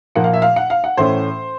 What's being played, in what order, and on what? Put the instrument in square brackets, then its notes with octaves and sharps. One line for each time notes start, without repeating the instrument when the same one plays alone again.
[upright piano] A#2 F3 A#3 F#5
F5
E5
F5
F#5
F5
F#5
A2 E3 A3 C#4 C5